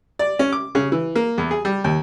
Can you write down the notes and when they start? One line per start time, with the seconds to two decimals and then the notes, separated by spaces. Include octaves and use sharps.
0.19 D5
0.39 C#4
0.52 D6
0.75 C#3
0.92 E3
1.15 A#3
1.38 E2
1.51 G#4
1.65 G3
1.84 D#2